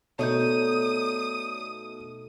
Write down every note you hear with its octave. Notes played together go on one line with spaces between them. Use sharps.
B2 A3 D#4 C#5 D5 D#6 G6